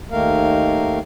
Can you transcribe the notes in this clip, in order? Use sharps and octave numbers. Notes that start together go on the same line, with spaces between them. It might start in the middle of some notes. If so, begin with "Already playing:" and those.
D#2 D#3 A3 A#3 A#4 F5